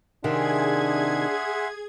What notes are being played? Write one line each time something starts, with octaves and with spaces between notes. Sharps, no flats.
C3 D#3 D4 G#4 E5 F#5 C6 G#6